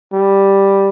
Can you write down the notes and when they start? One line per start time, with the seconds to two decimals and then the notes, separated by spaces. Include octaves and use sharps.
0.13 G3